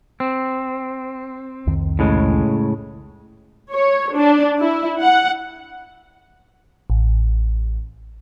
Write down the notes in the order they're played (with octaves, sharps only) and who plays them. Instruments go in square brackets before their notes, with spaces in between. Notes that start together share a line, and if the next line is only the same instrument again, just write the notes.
[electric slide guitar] C4
[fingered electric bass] C2 F2 D#3
[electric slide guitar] A2 C#3 G#3
[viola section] C#5
D4
E4
F#5
[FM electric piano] A1